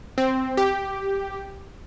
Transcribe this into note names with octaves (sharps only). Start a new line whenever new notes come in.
C4
G4